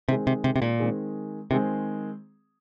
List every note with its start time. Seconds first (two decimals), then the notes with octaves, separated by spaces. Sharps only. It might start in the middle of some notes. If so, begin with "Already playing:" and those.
0.08 C3 D#3 G#3 C4 G#4
0.27 C3
0.44 C3
0.56 C3
0.62 A#2
0.80 D#3 G#3 C4 G#4
1.51 C3 D#3 G#3 C4 G#4